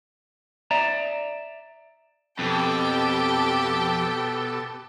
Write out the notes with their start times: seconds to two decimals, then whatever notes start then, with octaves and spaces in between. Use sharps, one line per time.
0.71 D5 E5 A#5
2.39 F2 B2 G4 A4 G5 A5